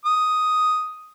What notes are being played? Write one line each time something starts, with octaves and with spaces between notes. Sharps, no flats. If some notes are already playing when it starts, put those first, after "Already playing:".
D#6